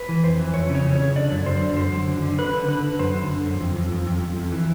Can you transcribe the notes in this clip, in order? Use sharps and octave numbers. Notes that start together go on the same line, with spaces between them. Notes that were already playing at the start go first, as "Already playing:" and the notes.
Already playing: B4
E3
F2 C5
E3
F2 C#5
C#3
C#5
F2
C#3 C#5
D3 D5
F#2
F#2 C5
D3
F#2 C5
F#2
D3
D3
D3 B4
D3
D3 B4
D3
F#2 C5
D3
D3
F#2
F2
F2
F2
F2
F2
F2
E3